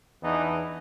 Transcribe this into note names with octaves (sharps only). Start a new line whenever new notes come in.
E2 E3 B3 D4 D#4